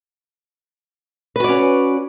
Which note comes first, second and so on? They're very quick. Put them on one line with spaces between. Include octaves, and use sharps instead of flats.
B4 F#4 D5 C#4